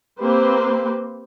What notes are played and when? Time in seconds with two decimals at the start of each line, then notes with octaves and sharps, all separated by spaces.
0.19 A#3 C4 G4 B4 C5